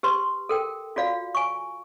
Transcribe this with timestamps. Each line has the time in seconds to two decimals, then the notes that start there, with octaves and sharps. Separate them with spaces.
0.03 G4 B4 C6
0.49 A4 A#4 G5
0.96 F4 F#4 D5 F5
1.35 G#5 C#6